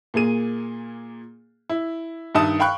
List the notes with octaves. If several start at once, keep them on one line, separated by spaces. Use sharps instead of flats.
A#2 A#3 G#4 D#7
E4
G2 D#3 E5 A5 D#6
F5 G5 B5 C#6 F#6